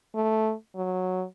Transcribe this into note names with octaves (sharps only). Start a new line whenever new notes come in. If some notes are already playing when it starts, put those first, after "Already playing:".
A3
F#3